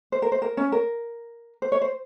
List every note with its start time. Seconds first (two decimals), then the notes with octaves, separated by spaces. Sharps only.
0.12 C5
0.22 A#4
0.32 C5
0.42 A#4
0.57 C#4
0.72 A#4
1.62 C5
1.72 C#5
1.82 C5